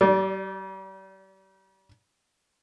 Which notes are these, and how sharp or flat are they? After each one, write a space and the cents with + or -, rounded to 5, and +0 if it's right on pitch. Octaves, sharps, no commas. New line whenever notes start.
G3 -40 D5 +0